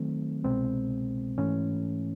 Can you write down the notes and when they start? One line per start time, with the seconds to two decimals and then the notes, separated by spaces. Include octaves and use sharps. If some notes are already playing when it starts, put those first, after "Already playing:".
Already playing: D#3 F#3 A3 C4
0.44 C2 B2 G#3 C4
1.38 G#2 E3 A3 C#4